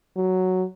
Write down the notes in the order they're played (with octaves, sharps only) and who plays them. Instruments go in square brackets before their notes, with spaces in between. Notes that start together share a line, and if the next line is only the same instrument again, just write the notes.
[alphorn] F#3